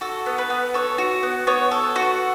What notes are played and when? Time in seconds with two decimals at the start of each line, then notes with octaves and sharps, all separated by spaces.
0.01 F#4 A4
0.26 B3
0.38 B4
0.50 B3
0.74 A4 C#5
0.98 F#4
1.23 B3
1.47 B3 C#5
1.71 A4
1.96 F#4